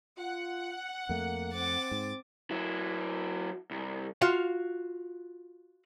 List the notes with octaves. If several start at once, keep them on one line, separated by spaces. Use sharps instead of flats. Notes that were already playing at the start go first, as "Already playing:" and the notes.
F4 F#5
F2 A3 A#3
C4 D6 A6
G#2
F#3 E4
C2
F4 F#4 F5